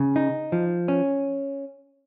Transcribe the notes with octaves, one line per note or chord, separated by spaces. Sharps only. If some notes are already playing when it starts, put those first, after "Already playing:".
Already playing: C#3
D#4
F3
C#4